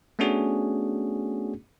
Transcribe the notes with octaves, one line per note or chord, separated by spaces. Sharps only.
A3 B3 C#4 D4 F#4 G#4